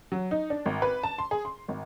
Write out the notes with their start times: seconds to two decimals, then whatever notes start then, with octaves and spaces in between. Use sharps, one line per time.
0.12 F#3
0.31 D#4
0.50 D4
0.66 G#1
0.82 B4
1.03 A5
1.18 C6
1.31 G#4
1.45 C6
1.68 G#1